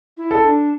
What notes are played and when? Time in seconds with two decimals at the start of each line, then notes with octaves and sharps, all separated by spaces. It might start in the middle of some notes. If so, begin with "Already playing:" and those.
0.17 E4
0.31 A4
0.44 D4